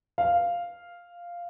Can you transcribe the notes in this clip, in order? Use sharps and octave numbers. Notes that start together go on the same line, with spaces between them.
F5